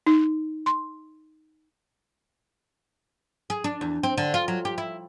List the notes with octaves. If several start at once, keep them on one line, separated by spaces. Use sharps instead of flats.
D#4
C6
G#4
D4
E2
C4
D3
F4
F#3
G4
E4